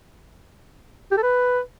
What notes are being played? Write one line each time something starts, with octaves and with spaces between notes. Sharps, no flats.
G4
A4
B4